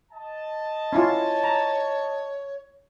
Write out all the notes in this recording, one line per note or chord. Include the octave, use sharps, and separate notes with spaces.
D#5 A5
C#4 E4 F4 C#5
A#5